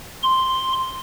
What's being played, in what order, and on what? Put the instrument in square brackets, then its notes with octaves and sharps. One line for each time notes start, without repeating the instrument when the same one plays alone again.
[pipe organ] C6